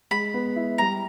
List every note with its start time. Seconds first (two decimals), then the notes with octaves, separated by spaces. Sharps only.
0.11 G#3 B5
0.34 B3
0.56 E4
0.78 G3 A#5